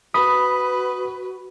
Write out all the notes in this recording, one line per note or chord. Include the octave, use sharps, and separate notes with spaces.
F#4 B4 B5 D#6